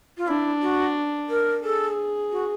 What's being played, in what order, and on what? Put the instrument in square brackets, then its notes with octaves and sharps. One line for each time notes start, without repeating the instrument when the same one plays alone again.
[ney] F4
[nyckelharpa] D4 [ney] E4
[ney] F#4
A#4
[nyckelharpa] G#4 [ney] A4
[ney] F#4